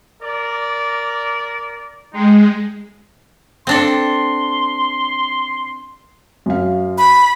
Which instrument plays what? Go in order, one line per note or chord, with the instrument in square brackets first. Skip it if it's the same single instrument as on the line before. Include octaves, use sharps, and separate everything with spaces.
[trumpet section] A#4 D5
[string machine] G#3 [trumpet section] D#4 G5 C6
[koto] C4 D4 A4 [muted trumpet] C6
[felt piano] F#2 F5
[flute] B5